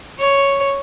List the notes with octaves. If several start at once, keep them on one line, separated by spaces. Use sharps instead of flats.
C#5